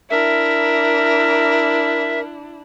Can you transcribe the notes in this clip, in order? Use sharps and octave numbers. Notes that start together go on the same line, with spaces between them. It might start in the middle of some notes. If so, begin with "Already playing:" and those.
D4 E4 A#4 E5